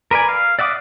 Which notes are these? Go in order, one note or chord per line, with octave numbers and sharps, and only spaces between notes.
A#4 B4 D5 G#5
F5
D5 E5 F#5 D6 D#6